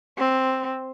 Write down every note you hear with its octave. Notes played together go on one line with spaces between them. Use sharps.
C4